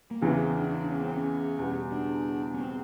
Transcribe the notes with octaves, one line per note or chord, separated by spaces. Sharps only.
A#3
E2 C#3 E3 B3
C#4
C4
D4
D4
D4
C#4
C4
C#4
E2 B2 G3
D4
C#4
C4